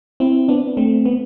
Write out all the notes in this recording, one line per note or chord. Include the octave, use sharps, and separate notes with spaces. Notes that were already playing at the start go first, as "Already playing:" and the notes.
C4 E4
B3 D4
A3 C4
B3